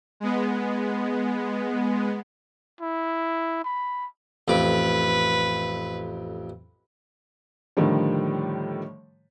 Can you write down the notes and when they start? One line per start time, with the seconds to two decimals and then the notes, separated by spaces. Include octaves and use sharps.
0.20 G#3 B3
2.81 E4
3.65 B5
4.48 A1 F2 B4 D6
7.77 A2 D3 D#3 F3 G3